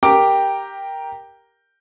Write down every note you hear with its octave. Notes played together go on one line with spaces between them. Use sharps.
G4 A#4 G5 A#5 D6